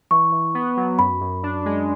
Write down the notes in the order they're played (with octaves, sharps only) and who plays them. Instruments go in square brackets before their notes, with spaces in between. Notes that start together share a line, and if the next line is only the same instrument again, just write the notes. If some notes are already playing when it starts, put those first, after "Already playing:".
[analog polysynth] E3 [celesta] C#6
[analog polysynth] E3
B3
F#3
[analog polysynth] F#2 [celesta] B5
[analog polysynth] F#2
D4
G#3